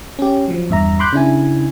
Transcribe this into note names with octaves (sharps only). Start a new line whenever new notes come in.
C#4 G4
F3 F#3
E2 G2 E5 A#5
B5 C6 D6 F#6 G6
C#3 D4 E4 G#5